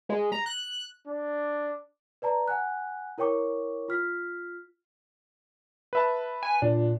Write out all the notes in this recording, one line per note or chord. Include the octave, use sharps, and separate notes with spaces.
G#3
A#5
F#6
D4
B4 D5 A5 A#5
F#5 G#5 F#6
E4 A#4 C#5 G5 C#6 D6
F4 F6 B6
B4 E5 A5
G#5
A#2 D4